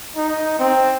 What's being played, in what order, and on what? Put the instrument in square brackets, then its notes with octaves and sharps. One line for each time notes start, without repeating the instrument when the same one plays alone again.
[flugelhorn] D#4
C4